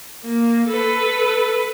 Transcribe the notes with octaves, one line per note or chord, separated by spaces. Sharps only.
A#3
A4 B4